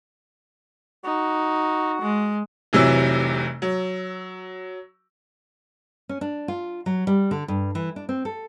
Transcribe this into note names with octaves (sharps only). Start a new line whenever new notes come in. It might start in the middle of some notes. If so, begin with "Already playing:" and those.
D#4 F#4
G#3
F1 C3 E3 F#3 E6
F#3
C#4
D4
F4
F#3
G3
D3
G2
E3
D4
C4
A4